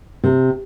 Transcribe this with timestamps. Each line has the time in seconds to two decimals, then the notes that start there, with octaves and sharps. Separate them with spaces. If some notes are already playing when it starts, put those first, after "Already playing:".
0.24 C3